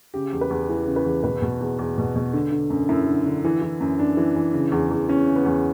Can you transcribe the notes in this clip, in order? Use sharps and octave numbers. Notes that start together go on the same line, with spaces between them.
C#3 G4
E2
B4
E2
E3
C#3
B4
E2
B2 B4
B2
E2
E2
B2
B2
D3
D3
F#2
F#2 E4
D3
D3
E3
E3
F#2
F#2 D4
E3
E3
C#3
E2
E2
E3 C#4
C#3
B3
E2